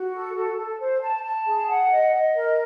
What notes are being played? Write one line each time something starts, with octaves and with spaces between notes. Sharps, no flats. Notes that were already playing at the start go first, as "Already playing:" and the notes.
Already playing: F#4
A4
A4
A4
C5
A5
A5
G#4
F#5
D#5
D#5
A#4